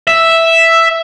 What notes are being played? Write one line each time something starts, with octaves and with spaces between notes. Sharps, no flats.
E5